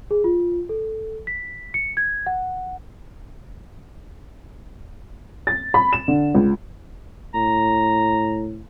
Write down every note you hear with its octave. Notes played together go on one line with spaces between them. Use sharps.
G#4
F4
A4
B6
C#7
G#6
F#5
A6
B5
E7
D3
C#2
A2 A#5